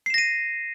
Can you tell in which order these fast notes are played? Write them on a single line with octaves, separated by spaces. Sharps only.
C7 E7 A#6 D#7